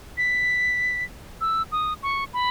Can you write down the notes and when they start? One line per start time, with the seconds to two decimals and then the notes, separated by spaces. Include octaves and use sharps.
0.18 B6
1.41 E6
1.72 D#6
2.03 C#6
2.34 B5